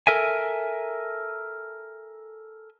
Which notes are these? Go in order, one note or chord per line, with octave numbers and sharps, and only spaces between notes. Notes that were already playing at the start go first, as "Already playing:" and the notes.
A4 A#4 E5 G#5